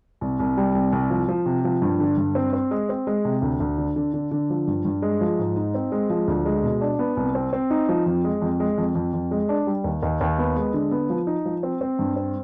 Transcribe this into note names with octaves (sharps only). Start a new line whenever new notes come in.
C2
C2
G3
C2
C2
F3
F3
C3
F3
G2
D3
G2
C4
C4
G#3
C4
G#3
C3
D2
D2
D3
D3
D3
D3
F3
G2
G2
G#3
F3
G#2
D#4
C4
G#3
F3
D2
G#3
B2
D4
B3
C2
C4
C4
D#4
F3
F2
G#3
F2
G#3
F2
F2
F2
G#3
D4
G3
D#2
D#2
D#2
B3
G#3
D3
B3
F3
D#4
F3
C4
C4
G2
C4